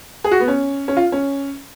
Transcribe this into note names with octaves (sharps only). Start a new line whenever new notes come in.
G#4
F#4
B3
C#4
C#4
F4
C#4